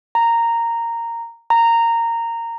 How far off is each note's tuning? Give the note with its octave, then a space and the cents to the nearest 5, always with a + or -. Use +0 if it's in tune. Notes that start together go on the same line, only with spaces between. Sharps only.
A#5 -10
A#5 -15